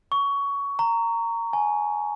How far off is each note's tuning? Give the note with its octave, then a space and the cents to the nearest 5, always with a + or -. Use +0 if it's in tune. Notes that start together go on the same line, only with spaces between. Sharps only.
C#6 +20
A#5 -15
G#5 +15